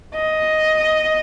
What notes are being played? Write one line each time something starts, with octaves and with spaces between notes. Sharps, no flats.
D#5